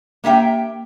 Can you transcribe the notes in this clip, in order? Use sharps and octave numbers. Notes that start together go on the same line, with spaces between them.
A#3 G4 E5 G5